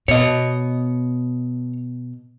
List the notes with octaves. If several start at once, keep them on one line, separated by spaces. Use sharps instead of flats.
B2 C#5 D#5